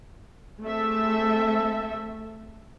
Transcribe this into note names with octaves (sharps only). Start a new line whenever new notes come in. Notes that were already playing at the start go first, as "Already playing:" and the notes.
A3 C4 G#4 A4 E5